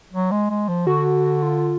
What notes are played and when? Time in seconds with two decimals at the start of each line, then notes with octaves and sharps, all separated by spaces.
0.13 F#3
0.31 G#3
0.50 G#3
0.68 F3
0.87 D3 F#4
1.43 F4